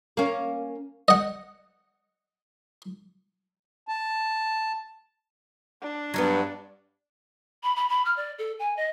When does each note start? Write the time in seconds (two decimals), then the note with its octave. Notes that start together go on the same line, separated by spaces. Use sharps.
0.17 A#3 C#4
1.08 D#5 F#5
3.88 A5
5.82 D4
6.14 G2 F#3 G3 B3
7.63 B5
7.76 B5
7.89 B5
8.05 F6
8.17 D5
8.38 A4
8.59 G#5
8.77 D#5